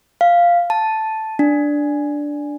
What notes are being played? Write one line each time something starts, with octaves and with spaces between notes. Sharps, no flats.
F5
A5
D4